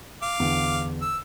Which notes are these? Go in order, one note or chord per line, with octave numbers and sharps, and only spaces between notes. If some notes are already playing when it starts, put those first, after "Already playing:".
F5 D6
E2 D3
E6